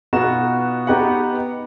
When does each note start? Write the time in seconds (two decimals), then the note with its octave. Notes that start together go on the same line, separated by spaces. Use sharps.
0.13 B2 B3 D#4 F4 F#4 E7
0.87 B3 D#4 G4 B4 F#5